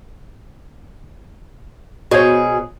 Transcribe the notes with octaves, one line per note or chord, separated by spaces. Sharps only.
B2 F#4 G#4 C5 C#5